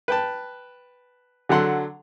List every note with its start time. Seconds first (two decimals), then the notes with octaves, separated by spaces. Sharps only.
0.08 B4 G5 A5
1.49 D3 F#3 A4 F#5 C6